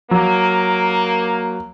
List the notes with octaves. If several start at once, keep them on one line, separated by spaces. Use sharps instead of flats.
F#3 A#3